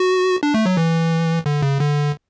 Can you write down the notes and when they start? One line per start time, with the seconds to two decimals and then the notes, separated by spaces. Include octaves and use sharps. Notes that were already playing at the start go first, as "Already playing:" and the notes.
Already playing: F#4
0.43 D4
0.54 A3
0.66 F#3
0.77 E3
1.46 D3
1.62 C#3
1.80 D3